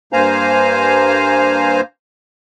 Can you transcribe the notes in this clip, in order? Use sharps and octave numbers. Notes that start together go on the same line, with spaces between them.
G2 A#3 C5 F5 G#5 A#5